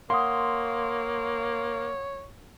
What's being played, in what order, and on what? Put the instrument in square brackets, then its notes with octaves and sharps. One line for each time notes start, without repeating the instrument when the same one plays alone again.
[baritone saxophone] A#3 [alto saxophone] C#5 [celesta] F5 F#5 D#6 [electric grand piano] C6